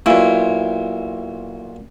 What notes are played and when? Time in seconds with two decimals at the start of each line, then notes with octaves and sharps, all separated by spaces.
0.06 B1 A#2 E4